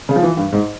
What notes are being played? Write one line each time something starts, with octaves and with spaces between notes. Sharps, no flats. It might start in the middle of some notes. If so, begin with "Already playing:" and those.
C#3
F3
E3
G2
G#2